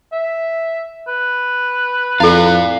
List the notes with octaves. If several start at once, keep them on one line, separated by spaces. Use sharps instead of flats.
E5
B4
F2 E4 A4 D5 F5